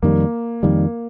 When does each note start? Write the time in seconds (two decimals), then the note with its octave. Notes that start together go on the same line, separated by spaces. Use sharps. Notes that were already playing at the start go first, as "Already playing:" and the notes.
0.02 F2 D#3 G3 A#3
0.63 F2 D#3 G3 A#3